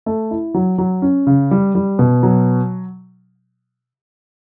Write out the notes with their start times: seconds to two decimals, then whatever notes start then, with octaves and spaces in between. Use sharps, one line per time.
0.06 A3
0.31 E4
0.54 F#3
0.78 F#3
1.02 C#4
1.27 C#3
1.51 G3
1.75 G3
1.99 B2
2.23 F#3